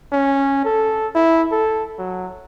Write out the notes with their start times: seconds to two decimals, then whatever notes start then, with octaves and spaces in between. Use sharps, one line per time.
0.12 C#4
0.65 A4
1.15 E4
1.52 A4
1.98 F#3